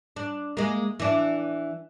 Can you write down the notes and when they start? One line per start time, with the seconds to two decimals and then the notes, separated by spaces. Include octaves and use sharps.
0.16 D4
0.57 G#3 A#3
1.00 E3 D4